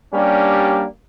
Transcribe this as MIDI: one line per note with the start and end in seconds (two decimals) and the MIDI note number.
0.13 0.84 55
0.13 0.84 58
0.13 0.84 61
0.13 0.84 62
0.13 0.84 67